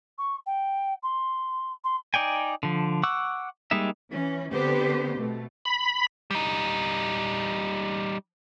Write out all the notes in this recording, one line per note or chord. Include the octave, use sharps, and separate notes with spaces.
C#6
G5
C6
C6
D#4 D5 G5 G#5
D3 F3
F#5 C#6 D6 E6 F#6
G3 G#3 A#3 D#4 E5
E3 C#4
D3 B3 C4 G4 B4 C5
B2 A3
B5
G3 D#4